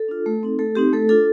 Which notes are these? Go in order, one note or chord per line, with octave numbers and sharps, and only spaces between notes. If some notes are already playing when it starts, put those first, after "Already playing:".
Already playing: A4
D4 F4
A3
C4 D#4
A3 A4
C4 D#4 G4
A3 A4
D4 F4 A4